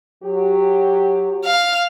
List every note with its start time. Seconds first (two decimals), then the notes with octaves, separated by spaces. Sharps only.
0.23 F#3 G4
1.45 F5